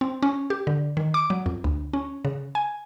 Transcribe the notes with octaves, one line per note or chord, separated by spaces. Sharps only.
C4
C#4
G4
D3
D#3
D6
F#3
F2
D2
C#4
C#3
G#5